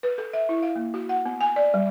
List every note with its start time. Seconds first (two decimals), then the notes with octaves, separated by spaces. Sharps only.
0.03 B4
0.18 A4
0.33 E5
0.49 E4
0.62 F5
0.76 A#3
0.94 F#4
1.09 F#5
1.25 B3
1.41 G#5
1.56 D5
1.74 G3